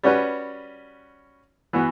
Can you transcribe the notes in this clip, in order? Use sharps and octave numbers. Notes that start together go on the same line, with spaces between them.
G3 C#4 F#4 B4
E3 B3 F#4